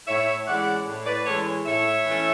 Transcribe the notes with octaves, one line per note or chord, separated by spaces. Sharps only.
A2 C#5 E5
E3 G#3 C#4 E4 D5 F#5
A2
B4 D5
E3 G#3 C#4 E4 A4 C#5
A2 C#5 E5
E3 A3 C#4